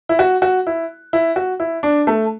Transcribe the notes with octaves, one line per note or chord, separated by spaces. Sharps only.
E4
F#4
F#4
E4
E4
F#4
E4
D4
A3